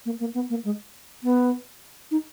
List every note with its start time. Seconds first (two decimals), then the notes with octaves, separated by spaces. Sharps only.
0.06 A#3
0.20 A#3
0.34 B3
0.50 A#3
0.65 G#3
1.24 B3
2.11 D#4